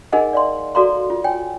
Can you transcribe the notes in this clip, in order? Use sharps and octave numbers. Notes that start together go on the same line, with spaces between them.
D#4 G#4 A#4 D#5 F#5 G#5
D5 F5 C6
F#4 A4 D5 F5 A#5 C6
F4
C#5 G5 G#5